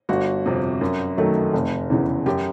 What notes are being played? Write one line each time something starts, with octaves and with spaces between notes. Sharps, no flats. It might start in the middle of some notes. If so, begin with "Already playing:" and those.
G1 F#4
F2 C3
F#2
D#3 F#3 A3
F1
E2 C#3 E3
F#2 G4